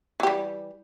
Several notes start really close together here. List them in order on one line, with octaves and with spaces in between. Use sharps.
E3 G4 G3